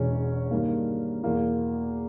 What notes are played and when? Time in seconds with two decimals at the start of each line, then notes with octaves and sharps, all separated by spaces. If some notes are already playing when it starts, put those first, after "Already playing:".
Already playing: E1 E2 B2 G#3 C#4
0.51 G2 D#3 A#3
1.23 E2 B2 A#3 E4